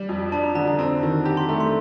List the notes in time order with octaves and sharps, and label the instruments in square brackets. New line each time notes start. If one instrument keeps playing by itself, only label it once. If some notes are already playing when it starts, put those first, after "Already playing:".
Already playing: [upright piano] G3
F2
[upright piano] D4 [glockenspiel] A5
[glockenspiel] A#5
[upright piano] D3 [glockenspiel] A#5
[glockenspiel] A5
[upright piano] C4
D#3
[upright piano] G4 [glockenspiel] A#5
[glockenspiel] C6
[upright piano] A3 [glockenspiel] A#5
[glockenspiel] C6